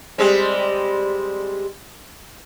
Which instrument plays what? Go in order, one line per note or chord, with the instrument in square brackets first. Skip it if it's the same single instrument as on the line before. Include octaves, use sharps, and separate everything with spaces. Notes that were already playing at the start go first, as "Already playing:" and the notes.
[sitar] G3 G#3 C4